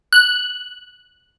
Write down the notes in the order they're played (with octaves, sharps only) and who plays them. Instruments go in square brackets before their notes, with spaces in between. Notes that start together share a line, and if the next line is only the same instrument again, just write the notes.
[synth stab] F#6